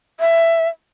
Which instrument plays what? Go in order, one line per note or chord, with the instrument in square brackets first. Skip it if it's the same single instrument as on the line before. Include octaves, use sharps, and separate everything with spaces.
[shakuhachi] E5